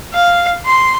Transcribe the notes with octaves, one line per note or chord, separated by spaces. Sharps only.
F5
C6